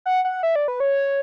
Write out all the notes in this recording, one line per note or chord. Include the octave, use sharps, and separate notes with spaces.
F#5
F#5
E5
D5
B4
C#5